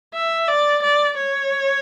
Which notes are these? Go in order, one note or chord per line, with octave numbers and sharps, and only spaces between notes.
E5
D5
D5
C#5